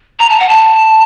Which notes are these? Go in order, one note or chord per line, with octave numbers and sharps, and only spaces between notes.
A#5
A5
F#5
A5